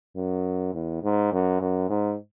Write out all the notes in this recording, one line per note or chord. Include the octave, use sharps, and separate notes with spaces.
F#2
E2
G#2
F#2
F#2
G#2